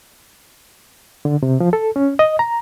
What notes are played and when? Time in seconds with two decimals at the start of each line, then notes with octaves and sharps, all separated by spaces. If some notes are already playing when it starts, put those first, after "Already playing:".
1.25 D3
1.43 C3
1.60 F3
1.73 A4
1.96 C#4
2.19 D#5
2.39 A#5